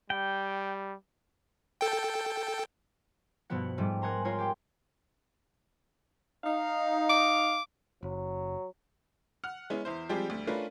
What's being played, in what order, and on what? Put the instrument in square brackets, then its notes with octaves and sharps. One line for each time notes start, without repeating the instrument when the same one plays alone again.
[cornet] G3 [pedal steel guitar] G5
[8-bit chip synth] A4 G5
[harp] G2 B2 F3 B3 F#5
G#2 F3 G3 A3
A#4 F#5 G#5 A#5 C6
F4 A#4 C#5 G#5 C6
G4 G5
[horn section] D#4 F5
[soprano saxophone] D6
[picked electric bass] F#1 [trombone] F#3
[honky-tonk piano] F#5 F6
G#3 B3 C#4 E4
E2 E4 C5
F3 G3 G#3 C4 G4 G#4
D2 G3
A3 C#4 D4 F4 A#4 B4